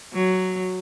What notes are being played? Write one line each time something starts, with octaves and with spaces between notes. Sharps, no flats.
F#3